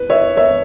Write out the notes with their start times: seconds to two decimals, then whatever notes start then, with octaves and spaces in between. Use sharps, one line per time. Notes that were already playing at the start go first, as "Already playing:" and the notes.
Already playing: B4
0.10 C#5 E5
0.37 C#5 E5